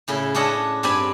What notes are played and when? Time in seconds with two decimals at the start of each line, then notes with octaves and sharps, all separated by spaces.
0.08 A2 C#3 E4
0.35 C#4 D4 A4 D#5 F#5
0.83 G2 C4 D5 G#5 B5